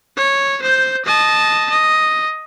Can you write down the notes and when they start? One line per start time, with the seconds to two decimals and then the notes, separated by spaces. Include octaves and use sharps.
0.17 C#5
0.62 C5 G6
1.05 D#5 A5
1.70 D#5